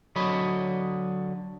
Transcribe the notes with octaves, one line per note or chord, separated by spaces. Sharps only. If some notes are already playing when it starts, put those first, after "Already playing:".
D3 F#3 C#5 D#5 B5